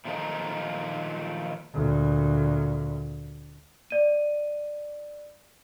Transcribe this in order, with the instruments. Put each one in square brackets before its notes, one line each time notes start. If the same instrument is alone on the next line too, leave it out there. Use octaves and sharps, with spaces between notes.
[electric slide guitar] A#2 D#3 F3 F#3 A3 D#4
[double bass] D2 A#2
[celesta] D5 D#7